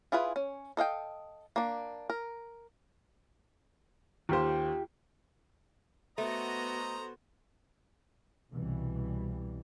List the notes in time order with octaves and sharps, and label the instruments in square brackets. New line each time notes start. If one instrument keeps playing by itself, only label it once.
[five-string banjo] E4 F4 G#4 B4
C#4
A4 D#5 F5 G5
A#3 D4
A#4
[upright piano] D#2 C5 [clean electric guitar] F4 G4
[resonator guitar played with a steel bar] A3 [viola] B3 F#4 [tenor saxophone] C5 [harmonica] D#5 A#5
[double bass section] C2 B2 E3 G3